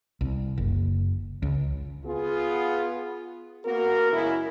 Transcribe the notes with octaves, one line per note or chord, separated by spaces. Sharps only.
C2
F#1
C#2
B3 F4 G#4
A#3 B3 F#4 A#4
F#2 C#3 G#3 E4